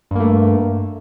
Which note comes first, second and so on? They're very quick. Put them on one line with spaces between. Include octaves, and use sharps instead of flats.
G2 A#3 A3